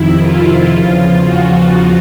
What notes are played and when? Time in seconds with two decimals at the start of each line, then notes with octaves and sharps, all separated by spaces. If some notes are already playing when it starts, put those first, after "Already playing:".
Already playing: F2 C3 D#3 E4
0.15 F4
0.68 E2 C#3 F3 F4
1.20 F#4